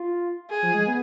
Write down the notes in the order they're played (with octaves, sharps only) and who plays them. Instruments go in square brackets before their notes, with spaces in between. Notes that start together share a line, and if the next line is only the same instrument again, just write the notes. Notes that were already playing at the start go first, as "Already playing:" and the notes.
Already playing: [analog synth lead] F4
[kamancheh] G#4
[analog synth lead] F3
G#3
B3